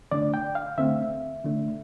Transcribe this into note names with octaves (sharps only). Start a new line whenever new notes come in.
D3 A3 D4 D5
G5
F5
D3 A3 C4 E5
D3 A3 D4